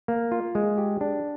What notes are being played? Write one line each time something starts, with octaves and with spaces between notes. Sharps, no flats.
A#3
F4
G#3
G4
D4